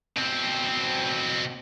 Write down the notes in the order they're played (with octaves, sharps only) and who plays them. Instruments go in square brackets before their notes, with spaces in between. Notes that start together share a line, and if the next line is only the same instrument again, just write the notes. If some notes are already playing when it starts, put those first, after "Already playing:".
[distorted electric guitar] B2 C4